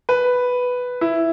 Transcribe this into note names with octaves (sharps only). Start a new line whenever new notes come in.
B4
E4